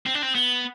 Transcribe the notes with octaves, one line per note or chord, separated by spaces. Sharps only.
C4
D4
C4
B3